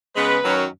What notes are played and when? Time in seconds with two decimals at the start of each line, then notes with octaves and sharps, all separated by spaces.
0.15 C#3 G#3 B3 B4
0.44 F#2 D#3 F#3 C#4